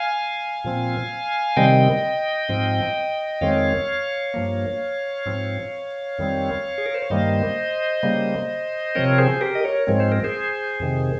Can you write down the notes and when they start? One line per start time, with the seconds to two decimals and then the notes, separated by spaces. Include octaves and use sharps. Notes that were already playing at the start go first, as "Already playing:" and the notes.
Already playing: F5 G#5
0.64 A#2 F3 C4
1.56 C3 D#3 G3 C4 D#5 G5
2.49 G#2 F3 C4
3.41 F2 D#3 G#3 C4 C#5 F5
4.34 G2 F3 A#3
5.26 G#2 F3 C4
6.19 F2 D#3 G3 C4
6.78 G#4
6.86 A#4
6.94 C5
7.02 C#5
7.10 G2 D#3 G3 A#3 C5 D#5
8.03 C#3 G3 A#3
8.95 C3 F3 C4 A#4 C#5
9.18 G#4 C5
9.41 G4 A#4
9.55 D#5
9.64 A#4 C#5
9.87 G#2 F3 G#3 C4 C#5
10.00 C5
10.12 A#4
10.24 G#4 C5
10.80 F2 C3 D#3